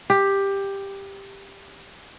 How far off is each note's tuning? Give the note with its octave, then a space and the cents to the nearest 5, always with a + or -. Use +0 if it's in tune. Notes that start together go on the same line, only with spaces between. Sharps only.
G4 +10